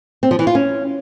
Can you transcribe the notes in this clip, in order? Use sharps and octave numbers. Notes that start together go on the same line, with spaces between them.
C4
F3
E3
F4
C#4